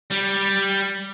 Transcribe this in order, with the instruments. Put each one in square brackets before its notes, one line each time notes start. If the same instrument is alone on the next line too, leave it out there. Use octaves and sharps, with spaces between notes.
[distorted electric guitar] G3